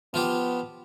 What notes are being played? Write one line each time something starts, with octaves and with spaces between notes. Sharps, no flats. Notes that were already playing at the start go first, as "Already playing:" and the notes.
F3 B3 F4 G4